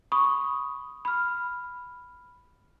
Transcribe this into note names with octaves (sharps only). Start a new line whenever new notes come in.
B5 C#6 D#6
B5 F6